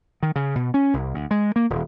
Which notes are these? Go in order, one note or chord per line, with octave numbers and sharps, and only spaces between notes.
D#3
C#3
B2
C#4
C2
D2
G#3
A#3
D#1